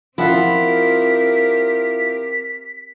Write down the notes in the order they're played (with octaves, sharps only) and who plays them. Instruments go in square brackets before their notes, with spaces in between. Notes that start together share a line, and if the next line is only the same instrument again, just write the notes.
[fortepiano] F3 F#5 [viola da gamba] C4 G4 A#4 [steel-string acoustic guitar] E4 F4 [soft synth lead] B6